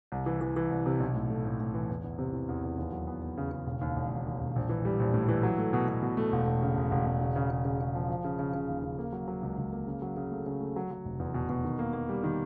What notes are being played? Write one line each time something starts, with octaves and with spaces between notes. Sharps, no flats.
C2
E3
E3
E3
C2
C3
B1
A2
A3
A2
A2
E3
E2
E2
C3
E3
E2
E2
D#2
F#3
B3
B3
C#3
C#3
E1
D#2
E1
D#2
D#2
E1
A#1
E3
G3
A#1
A2
E3
F#3
A3
B2
B2
B2
A3
E1
E1
C#3
E1
E1
E1
C#3
C#3
C#3
C#3
C#3
F3
F3
C#3
C#3
C#3
D#2
C#3
A#3
F#3
F#3
C#2
C#2
A#3
C#3
F#3
C#3
A3
C#3
A3
F#3
F#3
F1
E2
B2
B2
D#3
A#3
A#3
G3
D#3